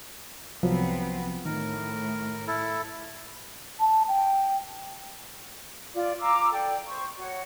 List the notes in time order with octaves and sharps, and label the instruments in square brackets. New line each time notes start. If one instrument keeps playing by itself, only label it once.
[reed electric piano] C2 F3 F#3 [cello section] B3 C4
[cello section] A2 [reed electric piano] D#3 [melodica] A#4
[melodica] E4 A4
[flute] A5
G5
[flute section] F4 D5
F5 A#5 D6 E6
A4 D5 G5
C5 C#6
F#4 C#5